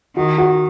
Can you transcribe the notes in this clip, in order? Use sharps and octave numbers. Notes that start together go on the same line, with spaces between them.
D#3 F#4
F#4